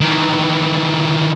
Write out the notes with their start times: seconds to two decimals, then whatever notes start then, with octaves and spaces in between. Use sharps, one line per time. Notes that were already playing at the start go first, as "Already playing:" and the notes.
0.01 D#3 E3